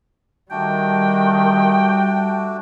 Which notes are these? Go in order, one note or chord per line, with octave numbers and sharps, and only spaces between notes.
D#3 G3 A3 D4 F#4 G5